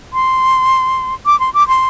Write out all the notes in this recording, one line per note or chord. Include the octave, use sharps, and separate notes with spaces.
C6
D6
C6
D6
C6